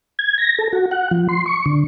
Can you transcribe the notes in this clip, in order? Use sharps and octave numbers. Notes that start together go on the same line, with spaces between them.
G#6
A#6
A4
F#4
F#5
F3
C6
C#6
D3